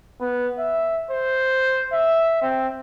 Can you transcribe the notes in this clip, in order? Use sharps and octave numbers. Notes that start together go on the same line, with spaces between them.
B3
E5
C5
E5
C4